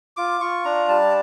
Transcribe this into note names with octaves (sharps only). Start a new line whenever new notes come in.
F4 D6
F4 C#6
D4 A#5
G3 A5